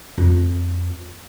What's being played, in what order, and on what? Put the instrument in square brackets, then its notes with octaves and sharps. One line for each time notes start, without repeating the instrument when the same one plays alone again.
[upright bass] F2 F4